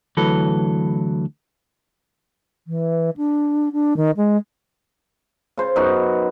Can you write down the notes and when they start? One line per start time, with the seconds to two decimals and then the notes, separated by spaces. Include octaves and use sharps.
0.17 D2 E3 F#3 A4 B4
2.67 E3
3.17 D4
3.72 D4
3.96 D#3
4.16 G#3
5.57 C#3 C5
5.76 F#2 B3 D#4 F#4